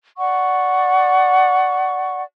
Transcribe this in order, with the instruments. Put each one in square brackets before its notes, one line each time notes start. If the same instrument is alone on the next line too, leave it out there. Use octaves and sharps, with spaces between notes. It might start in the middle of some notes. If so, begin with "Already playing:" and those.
[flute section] D5 F#5 C#6